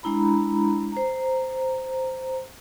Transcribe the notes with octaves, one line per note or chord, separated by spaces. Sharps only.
G#3 D4 E4 A#5 B5
C5 A#5